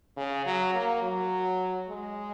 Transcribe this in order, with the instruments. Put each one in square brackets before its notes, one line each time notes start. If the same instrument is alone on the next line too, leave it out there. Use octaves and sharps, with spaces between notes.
[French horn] C#3
F#3
A#3
F#3
G#3